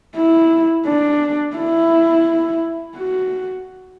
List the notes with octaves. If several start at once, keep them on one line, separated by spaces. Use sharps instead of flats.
E4
D4
E4
F#4